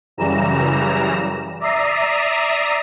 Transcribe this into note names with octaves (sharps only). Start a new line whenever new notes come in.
F#2 C#3 E3 G3 A#5 E7
D5 E5 A#5 D#6 C7